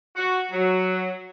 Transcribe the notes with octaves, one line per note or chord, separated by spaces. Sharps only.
F#4
F#3